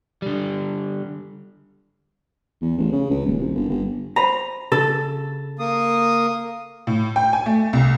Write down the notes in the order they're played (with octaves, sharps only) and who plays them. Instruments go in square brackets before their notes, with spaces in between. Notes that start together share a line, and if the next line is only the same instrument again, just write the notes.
[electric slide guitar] D3 G3
[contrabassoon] E2
A1
C#3
C#2
D#1
C2
G1
G1
[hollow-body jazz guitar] C5 B5 [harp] A#5
[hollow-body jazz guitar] C#3 [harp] A4
[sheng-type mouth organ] A#3 D#6
[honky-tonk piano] A2
G5
G#5
A3
C2